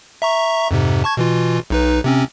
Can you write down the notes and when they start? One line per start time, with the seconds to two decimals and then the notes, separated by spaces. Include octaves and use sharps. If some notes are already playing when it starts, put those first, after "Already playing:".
0.22 E5 A#5 C#6
0.71 F2 G#2 C3
1.04 A5 C#6 G#6
1.17 B2 E3 F4
1.70 B1 D#4 B4
2.04 C3 C4 C#4